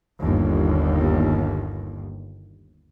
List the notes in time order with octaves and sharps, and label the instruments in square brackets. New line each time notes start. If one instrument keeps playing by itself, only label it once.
[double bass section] G1 D#2